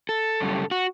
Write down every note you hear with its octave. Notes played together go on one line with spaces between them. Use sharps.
A4
F#2 C#3 G3
F#4